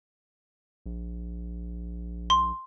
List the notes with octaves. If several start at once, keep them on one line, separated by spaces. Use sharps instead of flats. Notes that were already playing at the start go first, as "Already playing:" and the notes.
A#1
C6